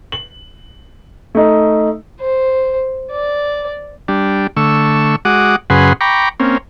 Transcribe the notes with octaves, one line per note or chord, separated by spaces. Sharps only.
F#7
A3 D#4
C5
D5
G3 D4
D3 A3 C#6 E6
G#3 F#4 F#5 D6 D#6
F#2 C#3 G#4 B4 F#5 C6
G5 A#5 B5 C#6 D6
A#3 C4 C#4